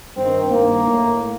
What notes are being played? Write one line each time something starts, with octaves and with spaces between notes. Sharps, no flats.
G2 D#3 C4
G2 D#3 A#3
A2